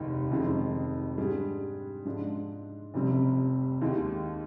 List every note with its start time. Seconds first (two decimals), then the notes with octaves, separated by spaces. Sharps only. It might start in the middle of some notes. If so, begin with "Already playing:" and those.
Already playing: F1 D#2 D#3 G#3
0.30 F1 F2 D#3 G#3
1.18 G#2 G3 D4 G#4
2.05 G#2 F3 G#3 D4
2.94 F1 F2 C3 G3
3.81 D#2 D#3 G#3